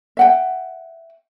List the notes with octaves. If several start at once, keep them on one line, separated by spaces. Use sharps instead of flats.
E5 F#5 G5